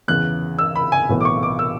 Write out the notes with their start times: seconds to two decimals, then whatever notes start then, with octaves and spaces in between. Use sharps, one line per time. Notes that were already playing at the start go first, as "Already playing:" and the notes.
0.08 E2 C#3 E3 F#6
0.59 E6
0.75 B5
0.92 G#5
1.09 B1 A2 E3 B3
1.21 D6
1.25 C#6
1.43 D6
1.59 E6